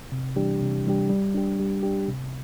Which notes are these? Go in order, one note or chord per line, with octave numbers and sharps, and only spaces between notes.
C3
E3 G3 D4 G4
C3
E3 G3 D4 G4
G3
D4 G4
G3
D4 G4
C3